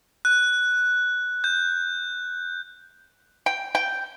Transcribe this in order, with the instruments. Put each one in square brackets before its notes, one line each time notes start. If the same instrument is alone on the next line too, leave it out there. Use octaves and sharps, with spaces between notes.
[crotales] F#6
G6
[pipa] G5
G5